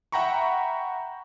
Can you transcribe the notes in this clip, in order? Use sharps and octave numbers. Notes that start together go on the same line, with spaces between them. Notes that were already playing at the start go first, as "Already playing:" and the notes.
E5 F#5 G5 A#5 B5 C#6